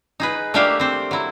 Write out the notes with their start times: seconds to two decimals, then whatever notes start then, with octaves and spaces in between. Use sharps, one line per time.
0.20 D#4 G#4 B4
0.54 A3 A#3 D4 G4 E5 F5
0.80 C4 C5
1.11 F#3 E4